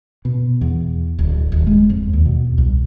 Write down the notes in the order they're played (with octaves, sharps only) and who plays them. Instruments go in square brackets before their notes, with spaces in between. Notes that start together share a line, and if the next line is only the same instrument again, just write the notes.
[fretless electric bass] B2
E2
D1
D#1
G#3
F2
D#2
B2
C2